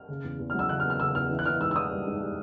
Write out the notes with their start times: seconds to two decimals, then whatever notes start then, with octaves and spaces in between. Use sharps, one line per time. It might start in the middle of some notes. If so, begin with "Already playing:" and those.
Already playing: F6
0.08 C#3
0.24 E2
0.39 E2
0.50 F6
0.55 F#3 E6
0.69 C#3 F#6
0.80 F6
0.85 B3
0.90 F6
1.00 C#3 E6
1.15 E2 F6
1.30 E3
1.39 F#6
1.45 E3 F6
1.60 G#2 E6
1.71 E6
1.76 E3 D#6
1.91 G3
2.06 G#2
2.21 G3